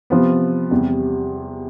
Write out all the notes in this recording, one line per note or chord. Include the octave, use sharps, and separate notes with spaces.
C3 F3 B3
E2 C3 G3